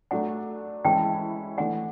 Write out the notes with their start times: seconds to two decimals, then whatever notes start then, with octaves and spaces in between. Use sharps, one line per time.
0.11 F#3 A3 D4 F#5 G#5
0.85 E3 G#3 C#4 E4 G5 A5
1.58 E3 A3 D4 F#5 G#5